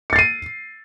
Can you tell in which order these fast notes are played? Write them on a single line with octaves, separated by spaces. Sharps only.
C#7 A6 C7 D#7